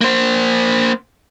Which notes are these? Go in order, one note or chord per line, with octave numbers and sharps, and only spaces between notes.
A#3 C5